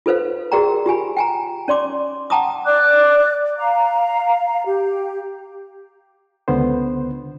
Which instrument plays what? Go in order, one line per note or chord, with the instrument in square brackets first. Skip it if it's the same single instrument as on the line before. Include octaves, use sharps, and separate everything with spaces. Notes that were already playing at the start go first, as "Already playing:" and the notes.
[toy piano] F4 A4 B4 C5 F5
F#4 G#4 A#4 D5 G5 A#5
F4 G4 G#5 B5
G5 G#5 A#5
C#4 D5 C6 D6
F#5 G5 A5 A#5 D6 D#6
[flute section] D5 D6 F#6
F5 A#5
G4
[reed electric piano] C#2 D3 B3 C5